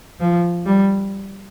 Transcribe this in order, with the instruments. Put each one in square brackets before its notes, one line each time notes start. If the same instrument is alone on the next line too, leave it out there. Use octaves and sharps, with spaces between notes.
[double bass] F3
G3